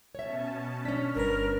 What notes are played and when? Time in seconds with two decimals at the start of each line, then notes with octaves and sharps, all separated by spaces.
0.15 B2 C#4 C#5 E5 A5
0.85 C#4 D4 F6 B6
1.15 G1 A#4 B4